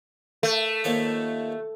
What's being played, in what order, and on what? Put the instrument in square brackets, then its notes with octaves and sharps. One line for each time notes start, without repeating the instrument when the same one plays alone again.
[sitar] A3
[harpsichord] D#2 F3 C#5